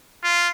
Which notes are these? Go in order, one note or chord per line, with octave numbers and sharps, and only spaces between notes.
F4